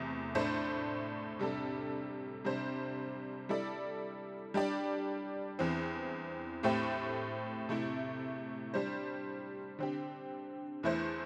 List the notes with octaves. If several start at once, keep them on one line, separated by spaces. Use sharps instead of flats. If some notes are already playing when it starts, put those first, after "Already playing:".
Already playing: E2 C3 A3
A2 A3 D4 C5
C3 G3 D4 A4
C3 G3 D4 C5
G3 E4 A4 D5
G3 D4 G4 D5
E2 E3 C4
A2 A3 C4 G4
C3 A3 E4
G3 D4 C5
D3 C4 G4
E2 E3 A3 E4 C5